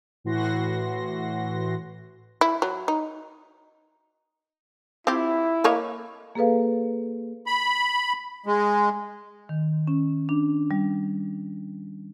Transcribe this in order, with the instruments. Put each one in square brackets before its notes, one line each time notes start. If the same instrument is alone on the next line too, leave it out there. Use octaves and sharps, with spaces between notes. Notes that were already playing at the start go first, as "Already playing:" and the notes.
[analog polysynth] A2 E3 F#4 C6 A#6
[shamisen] E4
F#3
D#4
[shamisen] C4 F4 G4 [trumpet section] E4
[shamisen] A#3 C#5 D#5
[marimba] A#3 G#4 A4 B4 F5
[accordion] B5
G#3
[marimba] D#3
C#4
D4
G3